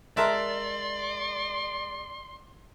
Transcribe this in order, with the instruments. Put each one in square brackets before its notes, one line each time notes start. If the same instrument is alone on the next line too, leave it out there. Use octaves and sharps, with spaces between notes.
[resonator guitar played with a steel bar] G#3 G#4 A#4 [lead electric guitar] D5 [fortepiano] E5 A5 A#5 [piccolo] C6